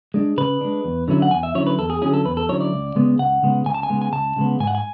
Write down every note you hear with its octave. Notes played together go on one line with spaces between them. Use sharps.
G#3 D4
C#3 B4
G#3 D4
E2
D3 F#3 C#4 E4
F#5
E2 G#5
E5
D3 F#3 C#4 E4 C#5
B4
E2 A4
G#4
D3 F#3 C#4 E4 G#4
A4
E2 B4
A4
D3 F#3 C#4 E4 C#5
D5
C#2
C#3 G#3 B3
C#2 F#5
C#3 G#3 B3
C#2 G#5
A5
G#5
C#3 G#3 B3
G#5
C#2 A5
C#3 G#3 B3
G#2 G#5
F#5
G#5